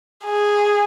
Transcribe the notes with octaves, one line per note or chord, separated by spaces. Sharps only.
G#4